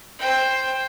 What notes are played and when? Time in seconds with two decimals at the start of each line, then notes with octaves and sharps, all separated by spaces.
0.19 C5 G5